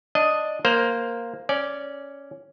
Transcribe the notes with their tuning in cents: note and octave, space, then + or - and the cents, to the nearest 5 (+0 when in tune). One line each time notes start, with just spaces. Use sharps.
D4 +0 D#5 +0
A#3 +0 C5 +0
C#4 +0 D5 -10